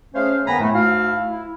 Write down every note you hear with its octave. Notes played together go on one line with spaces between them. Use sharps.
A3 C#4 G#4 C5 C#5 F5
G2 D#3 B3 G#5 A#5 B5
A2 A3
G#2 A3 E4 F#4 F5
E4